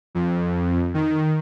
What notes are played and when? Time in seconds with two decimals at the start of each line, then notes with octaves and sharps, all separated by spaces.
0.15 F2
0.94 D#3